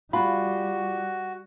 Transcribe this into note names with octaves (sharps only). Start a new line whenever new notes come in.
G3 F4 F#4 B5